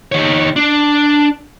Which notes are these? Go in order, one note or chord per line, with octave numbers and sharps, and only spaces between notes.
D#3 C#5
D4